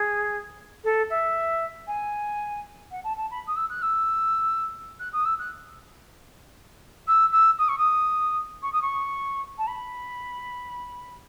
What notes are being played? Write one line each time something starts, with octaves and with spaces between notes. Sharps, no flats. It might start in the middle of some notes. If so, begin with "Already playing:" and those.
Already playing: G#4
A4
E5
G#5
F#5
A5
A5
B5
D#6
E6
F#6
E6
F#6
D#6
E6
F#6
E6
E6
D#6
C#6
D#6
C#6
D#6
C#6
A5
B5